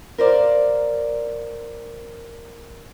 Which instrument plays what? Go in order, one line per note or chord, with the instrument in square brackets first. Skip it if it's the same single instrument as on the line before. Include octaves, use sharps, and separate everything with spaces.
[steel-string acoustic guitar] A#4 C5 D5 F5